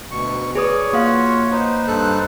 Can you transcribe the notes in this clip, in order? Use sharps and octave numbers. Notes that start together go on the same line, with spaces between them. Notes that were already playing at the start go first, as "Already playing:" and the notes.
D2 B2 C#6
G#4 B4 C#5 D5 D#6
A#3 F4 F#4 F5
D#4 B4 C5
G2 A4 F#6